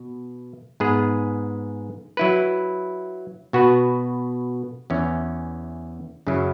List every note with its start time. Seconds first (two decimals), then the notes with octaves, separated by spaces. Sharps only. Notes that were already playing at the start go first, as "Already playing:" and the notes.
Already playing: B2 B3
0.80 G#2 G#3 B3 G#4 B4
2.17 F#3 E4 B4
3.53 B2 B3 F#4 B4
4.90 E2 E3 C#4
6.27 F#2 C#3 F#3 E4 C#5